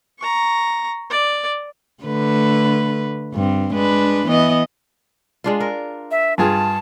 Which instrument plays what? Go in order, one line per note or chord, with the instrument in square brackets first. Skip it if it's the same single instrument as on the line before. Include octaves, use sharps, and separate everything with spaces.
[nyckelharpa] A#5 C#6
D5
[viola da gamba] D3 A3 B4
G2 C4
G#3 D4 B4
E3 B3 D#5
[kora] G#3 D4 F4
A#4
[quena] E5
[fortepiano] G2 F4 G#4 [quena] A5